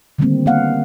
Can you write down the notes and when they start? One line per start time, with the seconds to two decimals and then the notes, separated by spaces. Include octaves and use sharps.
0.18 D3 D#3 G3 A3 A#3 C4
0.46 A#3 B3 F5 F#5